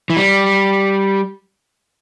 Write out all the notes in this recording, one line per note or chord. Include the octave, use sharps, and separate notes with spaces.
E3
G3